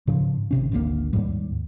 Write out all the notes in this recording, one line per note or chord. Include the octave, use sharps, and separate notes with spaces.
G#2 C#3 F3
G#1 C3 C#4
G#1 D2 C#3 A#3
D#2 G#2 G3